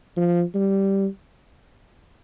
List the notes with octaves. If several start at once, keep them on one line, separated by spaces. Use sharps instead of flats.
F3
G3